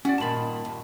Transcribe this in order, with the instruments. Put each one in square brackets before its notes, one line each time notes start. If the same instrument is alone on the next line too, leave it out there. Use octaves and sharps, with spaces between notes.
[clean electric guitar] C#4 D5 [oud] F#4
[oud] G2 A#2 D#3 [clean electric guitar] A5 B5
[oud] D#2